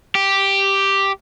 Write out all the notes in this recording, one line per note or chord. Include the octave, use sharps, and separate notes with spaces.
G4